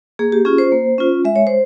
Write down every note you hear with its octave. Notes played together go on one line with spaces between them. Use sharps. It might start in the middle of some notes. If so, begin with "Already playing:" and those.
A#3 G#4
G4
C#4 F4 G#4
C5
A#3
C#4 F4
G#3 E5
C#5
C5